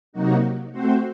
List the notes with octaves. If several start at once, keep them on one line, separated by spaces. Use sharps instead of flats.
C3 F#3 A#3 D#4 F#4
A3 C4 F#4 C5